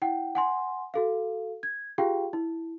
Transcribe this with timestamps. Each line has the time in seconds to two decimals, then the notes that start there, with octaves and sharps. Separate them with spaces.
0.02 E4 F#5 G5
0.35 F#5 G#5 C6
0.94 F#4 A4 F5
1.63 G#6
1.98 F4 G4 G#4 F5 G5
2.33 E4